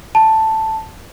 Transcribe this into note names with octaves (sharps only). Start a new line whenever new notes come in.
A5